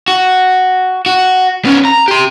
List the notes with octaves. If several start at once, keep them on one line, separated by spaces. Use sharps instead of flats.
F#4
F#4
B3 C#4
A#5
G4 C6